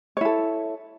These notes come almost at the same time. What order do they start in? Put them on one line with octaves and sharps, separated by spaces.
C#5 E4 A4